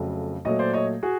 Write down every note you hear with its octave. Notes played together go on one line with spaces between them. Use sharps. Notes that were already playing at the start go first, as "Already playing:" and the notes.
Already playing: F2 C#3 F#3 A3
A#2 F#3 A3 C#5 D#5
C5 D5
C#5 D#5
F#4 G#4